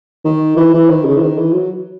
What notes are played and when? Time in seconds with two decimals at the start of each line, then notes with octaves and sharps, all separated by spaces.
0.25 D#3
0.57 E3
0.74 E3
0.90 D#3
1.05 C#3
1.17 E3
1.22 D#3
1.38 E3
1.53 F#3